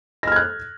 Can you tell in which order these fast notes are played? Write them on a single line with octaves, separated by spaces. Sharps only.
A#6 F6 G#6 F#6